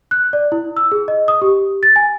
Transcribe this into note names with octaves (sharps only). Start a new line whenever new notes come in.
F#6
D5
E4
E6
G#4
D#5
D#6
G4
A6
G#5